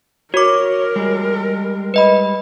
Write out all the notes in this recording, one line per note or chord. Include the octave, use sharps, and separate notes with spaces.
F#4 A#4 C#5 D6
G3 G#3 G#4
B4 D#5 B5